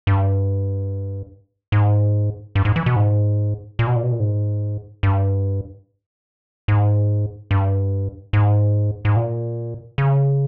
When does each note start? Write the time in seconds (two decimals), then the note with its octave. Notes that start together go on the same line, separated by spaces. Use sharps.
0.07 G2
1.72 G#2
2.55 G2
2.65 G#2
2.76 E3
2.86 B2
2.96 G#2
3.79 A#2
3.87 B2
3.96 A#2
4.03 B2
4.12 A#2
4.20 G#2
5.03 G2
6.68 G#2
7.51 G2
8.33 G#2
9.05 G#2
9.16 A#2
9.98 C#3